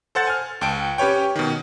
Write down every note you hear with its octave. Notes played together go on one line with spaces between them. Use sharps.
A4 C5 F#5 A6
G#5 F6
C#2 G5 A5 D7
C#4 G4 B4 C#5 G5
B2 D#3